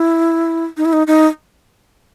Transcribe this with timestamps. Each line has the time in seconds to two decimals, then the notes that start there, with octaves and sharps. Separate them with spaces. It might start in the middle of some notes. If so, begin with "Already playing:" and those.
Already playing: E4
0.77 D#4
0.85 E4
0.93 D#4
1.07 D#4